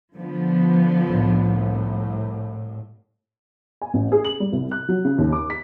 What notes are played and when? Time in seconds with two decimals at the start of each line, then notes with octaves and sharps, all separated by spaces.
0.15 D3 F3 B3
1.06 C2 A2
3.82 G#5
3.94 A1
4.12 G#4
4.25 F#7
4.40 G3
4.53 C2
4.71 F#6
4.89 F#3
5.05 C#3
5.18 D#2
5.32 D6
5.50 B6